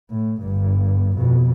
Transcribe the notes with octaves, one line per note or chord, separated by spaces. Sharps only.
A2
G1 G2
F2 B2